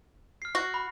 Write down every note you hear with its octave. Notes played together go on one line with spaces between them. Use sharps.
F6 C7
F#4
B5